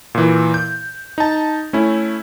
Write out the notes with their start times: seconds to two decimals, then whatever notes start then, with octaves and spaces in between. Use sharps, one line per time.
0.15 A#2 E3
0.54 G6
1.18 D#4 A5
1.73 A3 C#4 E4